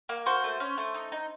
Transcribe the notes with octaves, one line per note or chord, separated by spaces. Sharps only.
A#3
F#4 C5
A3
C#4
A3
D#4
D#4